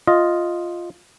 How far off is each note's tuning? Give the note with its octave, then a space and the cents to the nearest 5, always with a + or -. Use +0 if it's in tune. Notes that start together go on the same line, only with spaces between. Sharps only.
F4 +0 D#5 +0